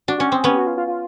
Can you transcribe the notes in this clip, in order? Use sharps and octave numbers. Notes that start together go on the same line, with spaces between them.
D4 F#4
C#4 F#4
C4 G4
G#4
B3 C#4 G4
F#4
F4
F4
F4